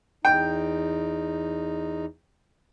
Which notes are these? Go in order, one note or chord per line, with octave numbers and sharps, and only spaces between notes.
E2 D#4 G5